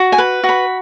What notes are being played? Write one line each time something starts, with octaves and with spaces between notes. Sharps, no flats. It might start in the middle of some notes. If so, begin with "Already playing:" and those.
Already playing: F#4
G#5
B4
F#4
B5